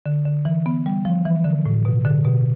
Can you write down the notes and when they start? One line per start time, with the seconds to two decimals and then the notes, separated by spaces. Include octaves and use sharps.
0.06 D3
0.25 D3
0.45 E3
0.66 B3
0.86 G3
1.05 F3
1.25 E3
1.45 D3
1.65 A2
1.85 B2
2.05 D3
2.25 B2